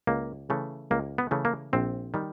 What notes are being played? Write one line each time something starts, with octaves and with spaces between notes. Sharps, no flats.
C#2 A#3
C#3 E3 A3
C#2 A#3
B3
C#3 E3 A3
A#3
A#1 C4
D#3 G3